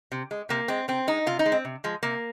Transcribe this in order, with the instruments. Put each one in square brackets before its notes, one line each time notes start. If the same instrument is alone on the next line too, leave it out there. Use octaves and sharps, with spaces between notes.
[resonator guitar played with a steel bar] C3
G#3
C3 A#3
G#3 C4
C3 C4
G#3 D#4
C3 F4
D#4
G#3
C4
C3
F3 G#3
C3 A#3